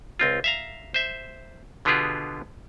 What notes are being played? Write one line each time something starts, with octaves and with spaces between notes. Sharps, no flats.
C#2 C4 F4
E5 F5 A#5
C5 E5
B2 D3 B3 F4 G4 G#4